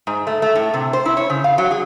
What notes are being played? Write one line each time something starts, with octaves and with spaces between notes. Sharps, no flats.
G#2
A3
A3
A2
C3
C5
E4
C#5
C#3
F5
F#3
G#4